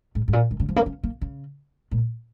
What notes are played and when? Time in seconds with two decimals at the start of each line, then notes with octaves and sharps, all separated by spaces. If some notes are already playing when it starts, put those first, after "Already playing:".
0.15 G#2
0.28 G#2
0.33 A#2
0.51 D#3
0.60 C#3
0.69 F3
0.76 A#3
0.86 C#4
1.03 A#3
1.21 C#3
1.91 A#2